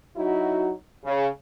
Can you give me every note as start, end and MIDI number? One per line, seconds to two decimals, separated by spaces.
0.16 0.72 54
0.16 0.72 63
0.16 0.72 64
0.16 0.72 66
1.04 1.28 49